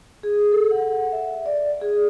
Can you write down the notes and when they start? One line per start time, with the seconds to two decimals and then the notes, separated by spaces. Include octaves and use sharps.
0.23 G#4
0.52 A4
0.71 F#5
1.12 E5
1.46 D5
1.81 G#4